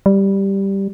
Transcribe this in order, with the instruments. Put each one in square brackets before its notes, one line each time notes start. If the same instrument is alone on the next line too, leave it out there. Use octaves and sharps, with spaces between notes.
[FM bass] G3